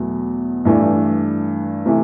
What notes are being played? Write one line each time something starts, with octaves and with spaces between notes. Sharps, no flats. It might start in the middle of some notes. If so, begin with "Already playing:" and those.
Already playing: E2 B2 F#3 A3
G2 E3 A3 D4
C3 E3 A3